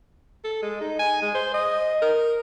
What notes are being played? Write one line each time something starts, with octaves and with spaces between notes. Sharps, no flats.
A4
G#3
D#4
G#5
G#3
C5
D#5
A#4